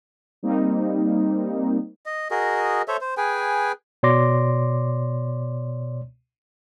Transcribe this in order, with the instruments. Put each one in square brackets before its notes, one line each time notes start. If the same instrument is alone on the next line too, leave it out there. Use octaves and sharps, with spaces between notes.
[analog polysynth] G3 A#3 C4 D#4
[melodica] D#5
F#4 G#4 A#4 D#5
A4 C5 C#5 E5
C5
G#4 B4 G5 G#5
[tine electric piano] B2 C#5 D5 C6 D6 A#6